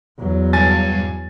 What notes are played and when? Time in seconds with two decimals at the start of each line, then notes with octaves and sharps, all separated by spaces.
0.18 E2 F#3
0.53 G2 G#5 A6